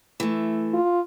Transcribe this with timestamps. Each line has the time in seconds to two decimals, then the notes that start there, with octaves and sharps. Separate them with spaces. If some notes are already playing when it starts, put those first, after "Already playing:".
0.20 E3 A3
0.74 F4